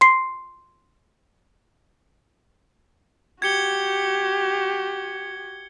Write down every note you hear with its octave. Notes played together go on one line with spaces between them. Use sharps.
C6 C7
F#4 G4 G#6 C#7 G7